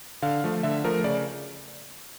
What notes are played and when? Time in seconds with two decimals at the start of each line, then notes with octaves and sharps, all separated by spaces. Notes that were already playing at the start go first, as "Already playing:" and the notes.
0.22 D3 F5
0.44 F3 A3
0.63 D3 E5
0.84 F3 A3 A#4
1.04 C#3 D5